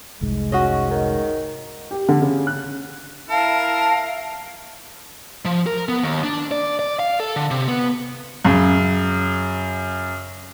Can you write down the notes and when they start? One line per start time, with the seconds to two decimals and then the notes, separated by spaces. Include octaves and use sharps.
0.21 F1 C2 G#2 G#3
0.52 C#4 F#4 D#5
0.91 D#3
1.91 G4
2.08 D3
2.22 C#3
2.47 F#6
3.30 E4 A#4 F5 A5
5.45 F3
5.67 A#4
5.89 B3
6.03 D#2
6.24 D4
6.51 D5
6.79 D5
6.99 F5
7.20 A4
7.36 D3
7.51 C3
7.68 B3
8.45 F#2 C#3